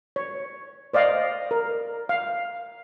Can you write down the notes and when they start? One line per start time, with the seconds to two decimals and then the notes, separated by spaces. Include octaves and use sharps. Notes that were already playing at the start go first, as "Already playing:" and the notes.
0.16 C#5
0.94 C5 D5 D#5 F5
1.51 A#4
2.09 F5